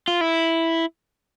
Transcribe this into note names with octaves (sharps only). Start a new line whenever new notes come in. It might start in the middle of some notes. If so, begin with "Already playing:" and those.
F4
E4